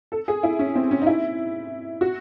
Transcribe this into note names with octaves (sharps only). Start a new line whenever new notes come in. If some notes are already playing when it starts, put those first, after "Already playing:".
A4
G#4
E4
C#4
C4
C#4
D#4
E4
F#4